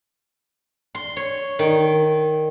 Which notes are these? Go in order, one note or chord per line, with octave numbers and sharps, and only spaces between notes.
C6
C#5
D#3